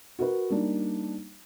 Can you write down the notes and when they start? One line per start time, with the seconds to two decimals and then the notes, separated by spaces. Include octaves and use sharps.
0.19 F#4 A#4 B4
0.50 G3 A#3 D4 D#4